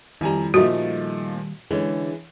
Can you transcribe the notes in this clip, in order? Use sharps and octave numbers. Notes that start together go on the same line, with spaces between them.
F2 D#3 G3 E4 G#5 A#5
A#2 F3 A3 D#4 F#4 E5
D3 E3 G#3 C#4